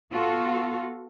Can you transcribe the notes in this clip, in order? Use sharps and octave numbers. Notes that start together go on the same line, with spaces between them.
B3 F4 F#4 A4